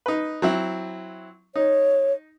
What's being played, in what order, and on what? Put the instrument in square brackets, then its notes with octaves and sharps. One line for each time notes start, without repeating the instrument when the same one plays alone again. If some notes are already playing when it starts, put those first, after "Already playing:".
[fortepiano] D#4 B4
F#3 C4 E4
[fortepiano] D#4 [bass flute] C#5